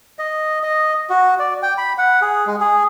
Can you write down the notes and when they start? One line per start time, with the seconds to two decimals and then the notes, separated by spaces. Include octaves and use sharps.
0.19 D#5
0.63 D#5
1.10 F#4
1.39 D5
1.63 G5
1.78 B5
1.98 F#5
2.22 G#4
2.47 G#3
2.60 G#4